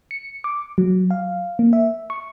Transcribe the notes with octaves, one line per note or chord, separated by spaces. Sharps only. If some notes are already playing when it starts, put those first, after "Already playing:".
C#7
D6
F#3
F5
A#3
E5
C#6